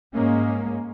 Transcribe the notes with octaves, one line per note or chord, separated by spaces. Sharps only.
G#2 G#3 A#3 C#4